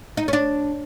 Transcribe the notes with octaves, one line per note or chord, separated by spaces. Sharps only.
D#4
C#4
D4